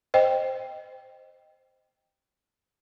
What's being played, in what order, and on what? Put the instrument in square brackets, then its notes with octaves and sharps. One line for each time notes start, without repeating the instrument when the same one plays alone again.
[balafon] C5 D#5 G5